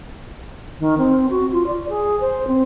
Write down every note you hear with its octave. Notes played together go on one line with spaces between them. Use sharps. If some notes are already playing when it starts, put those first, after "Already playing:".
D#3
C4
F#4
F4
D5
G#4
C5
C4